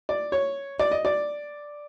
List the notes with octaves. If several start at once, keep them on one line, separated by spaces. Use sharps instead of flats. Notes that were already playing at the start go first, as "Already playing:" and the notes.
D5
C#5
D5
D#5
D5